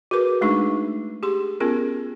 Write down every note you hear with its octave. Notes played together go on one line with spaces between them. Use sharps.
F#4 G#4 A#4 B4 D6
G#3 A3 D4 D#4 G#4 C#6
G4 G#4 C6
B3 C#4 F4 G#4 A#4